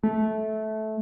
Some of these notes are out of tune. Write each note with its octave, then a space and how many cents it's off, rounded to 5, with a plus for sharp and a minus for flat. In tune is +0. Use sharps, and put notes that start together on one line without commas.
A3 -15